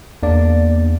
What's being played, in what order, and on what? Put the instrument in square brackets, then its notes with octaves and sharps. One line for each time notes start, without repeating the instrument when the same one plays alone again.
[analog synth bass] E2 [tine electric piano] A#3 D4 D5